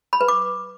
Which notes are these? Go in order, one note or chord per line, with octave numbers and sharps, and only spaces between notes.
B5
B4
D6